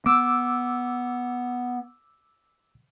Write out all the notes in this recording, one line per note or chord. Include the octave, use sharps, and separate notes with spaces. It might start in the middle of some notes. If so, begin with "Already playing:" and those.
B3 D6 E6